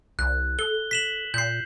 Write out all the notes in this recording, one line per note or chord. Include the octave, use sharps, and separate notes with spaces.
C2 F#6
A4 G7
B6 E7 F#7
A#2 G6 C7